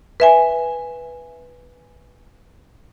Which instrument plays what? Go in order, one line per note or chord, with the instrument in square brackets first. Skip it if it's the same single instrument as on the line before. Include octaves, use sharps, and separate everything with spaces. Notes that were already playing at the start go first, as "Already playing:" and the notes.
[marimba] B4 E5 G#5